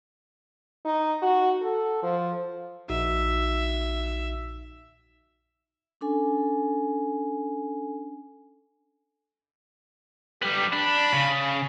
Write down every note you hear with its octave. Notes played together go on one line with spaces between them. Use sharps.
D#4
F#4
A4
F3
A#1 D#4 F#4 E5
C#4 D4 A4 G#5
G3 B3 G4
D4 B5
C#3